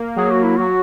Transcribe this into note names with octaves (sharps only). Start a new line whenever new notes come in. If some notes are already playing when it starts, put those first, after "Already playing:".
Already playing: A#3
F#3 G#4
F#4
E4
F#3 F#4